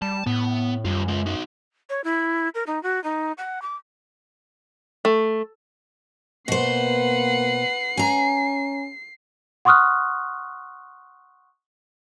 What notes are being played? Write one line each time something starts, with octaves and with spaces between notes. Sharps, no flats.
G3 A5
A2 B3
F#2 G3 F4
G#3 F4
D#4 F#4
C#5
E4
A#4
D#4
F#4
D#4
F#5
D6
A3
B2 A#3 B4 C5 F#5 C7
C#4 G#5 A#5
F#5 C6 C#6 D#6 F6 F#6